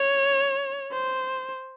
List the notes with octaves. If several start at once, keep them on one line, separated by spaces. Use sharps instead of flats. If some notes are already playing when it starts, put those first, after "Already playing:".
Already playing: C#5
C5